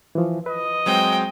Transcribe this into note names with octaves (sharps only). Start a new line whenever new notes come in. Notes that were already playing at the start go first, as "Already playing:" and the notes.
E3 F3
B4 D#5
F#3 G#3 C4 G5